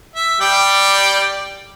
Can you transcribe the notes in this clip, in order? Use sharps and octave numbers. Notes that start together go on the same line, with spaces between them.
E5
G3 D5 G5